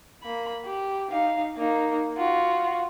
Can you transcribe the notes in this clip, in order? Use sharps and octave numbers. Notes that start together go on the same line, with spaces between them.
A#3 B5
G4
D#4 F5
A#3 D#4
F4 F#4